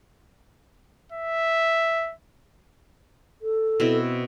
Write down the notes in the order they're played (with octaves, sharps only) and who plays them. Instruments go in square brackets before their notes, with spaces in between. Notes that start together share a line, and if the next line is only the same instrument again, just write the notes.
[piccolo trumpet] E5
[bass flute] A4
[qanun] B2 C4 E4